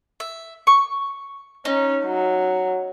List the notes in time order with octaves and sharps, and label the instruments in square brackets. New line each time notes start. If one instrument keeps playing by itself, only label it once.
[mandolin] E5
C#6
[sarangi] C#4 [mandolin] D#4
[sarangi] F#3